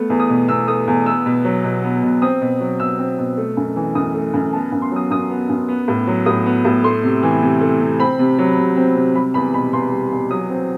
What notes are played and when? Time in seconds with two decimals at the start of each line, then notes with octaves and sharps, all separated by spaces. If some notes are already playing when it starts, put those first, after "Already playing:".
Already playing: A3 B3
0.10 E2
0.20 D#6
0.29 B2
0.48 E2 E6
0.68 A3 D#6
0.87 E2
1.06 B3 E6
1.26 B2
1.45 F#3
1.64 B2
1.83 B3
2.03 B2
2.22 C4 D#6
2.41 B2
2.60 F#3
2.80 B2 E6
2.99 C4
3.18 B2
3.37 A3
3.57 F#2
3.76 E3
3.95 F#2 D#6
4.15 A3
4.34 F#2
4.53 B3 A5
4.72 F#2
4.82 C6
4.92 F#3 D#6
5.11 F#2 D#6
5.30 B3
5.49 F#2
5.68 B3
5.88 A2
6.07 F#3
6.26 A2 D#6
6.46 B3
6.65 A2
6.84 A3 C6
7.03 C3
7.23 E3
7.42 C3
7.61 A3
7.81 C3
8.00 C4 B5
8.19 C3
8.39 F#3
8.58 C3
8.77 C4
8.96 C3
9.15 G3 B5
9.34 E2 B5
9.54 B2 B5
9.73 E2 C6
9.92 G3
10.12 E2
10.31 F#3 D#6
10.50 C4